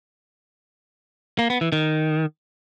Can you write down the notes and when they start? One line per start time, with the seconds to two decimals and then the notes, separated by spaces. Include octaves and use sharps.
1.39 A#3
1.50 B3
1.61 E3
1.72 D#3